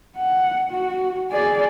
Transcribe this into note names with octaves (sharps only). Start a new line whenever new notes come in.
F#5
F#4
G#4 D5